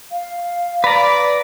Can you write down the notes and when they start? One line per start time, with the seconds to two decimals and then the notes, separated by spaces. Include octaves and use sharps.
0.11 F5
0.84 B4 D5 A#5